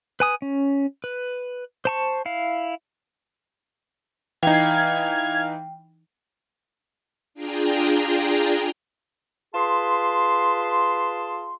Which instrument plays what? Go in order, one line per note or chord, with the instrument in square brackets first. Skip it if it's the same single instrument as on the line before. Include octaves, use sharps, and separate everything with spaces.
[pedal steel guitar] B4 G#5 D#6
C#4
B4
C5 A5 C#6
E4 F5
[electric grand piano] E3 D#4 [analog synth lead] F5 [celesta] G5 [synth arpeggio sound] G#6
[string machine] D4 F4 G#4 G5 A#5
[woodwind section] F4 G#4 B4 A5 C6